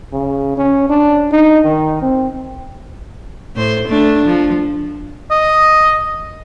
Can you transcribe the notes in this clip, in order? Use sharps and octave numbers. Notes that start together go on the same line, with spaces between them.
C#3
C#4
D4
D#4
D#3
C4
A2 C5
A3 D4
F3
D#5